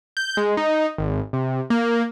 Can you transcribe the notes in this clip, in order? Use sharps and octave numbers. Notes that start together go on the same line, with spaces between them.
G6
G#3
D#4
G#1
C3
A#3